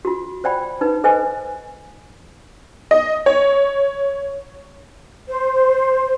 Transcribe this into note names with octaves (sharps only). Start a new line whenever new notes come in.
F4 F#4
C5 D5 G5 B5
D#4 B4
A4 B4 C5 D#5 G#5
D#5
C#5
C5